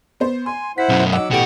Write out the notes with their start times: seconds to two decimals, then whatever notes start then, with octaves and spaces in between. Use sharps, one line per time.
0.20 B3 C5
0.46 G#5 C6
0.78 E4 C5 F#5 B6
0.89 B1 F#2 C#3
1.13 F#3 D#4 F#5 D6 E6
1.31 A1 B2 F#4 G4 A4 D7